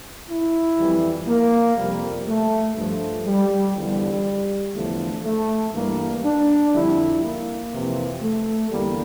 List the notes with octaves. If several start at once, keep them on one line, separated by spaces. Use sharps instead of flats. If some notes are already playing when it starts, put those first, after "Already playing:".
E4
F2 E3 G3
A#3
F2 C3 G3 A#3
A3
G2 F3 A3
G3
E2 D3 F3 G3
E2 D3 F3 A3
A3
G2 E3 G3 A#3
D4
F2 D3 G3 E4
A#3
F2 C3 E3
A3
E2 D3 G3 A#3